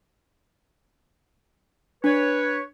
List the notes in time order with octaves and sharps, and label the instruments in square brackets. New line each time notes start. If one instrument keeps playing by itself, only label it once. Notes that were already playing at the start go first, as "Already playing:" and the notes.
[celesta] D4 [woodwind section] B4 C#5